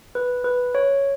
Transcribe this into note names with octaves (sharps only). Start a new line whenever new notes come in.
B4
B4
C#5